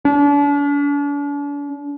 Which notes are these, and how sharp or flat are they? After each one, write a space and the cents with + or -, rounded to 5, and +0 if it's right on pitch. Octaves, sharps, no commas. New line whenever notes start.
D4 -40